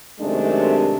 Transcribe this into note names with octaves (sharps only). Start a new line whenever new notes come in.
F#2 C3 D#3 G#3 A3 D4